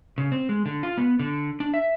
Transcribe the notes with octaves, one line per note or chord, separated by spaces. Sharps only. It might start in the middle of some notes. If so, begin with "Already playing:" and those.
C#3
C4
G#3
D3
F4
B3
D3
D4
E5